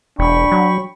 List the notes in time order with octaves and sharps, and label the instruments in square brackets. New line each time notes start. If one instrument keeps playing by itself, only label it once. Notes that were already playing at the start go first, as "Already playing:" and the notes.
[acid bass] E1 [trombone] D4 [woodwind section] G5 B5 C#6
[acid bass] F#3